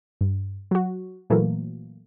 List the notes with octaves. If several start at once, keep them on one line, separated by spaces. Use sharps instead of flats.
G2
F#3 F#4
A#2 E3 F#3 A3 A#3